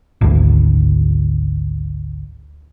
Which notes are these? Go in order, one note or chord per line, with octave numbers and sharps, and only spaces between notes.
G#1 D2